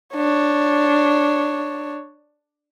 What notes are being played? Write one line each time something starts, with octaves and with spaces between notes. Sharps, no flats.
D4 C#5